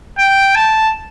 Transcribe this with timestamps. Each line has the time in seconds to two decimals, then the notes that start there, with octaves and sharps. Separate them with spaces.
0.18 G5
0.55 A5